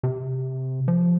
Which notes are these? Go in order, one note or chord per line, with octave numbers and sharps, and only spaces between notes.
C3
F3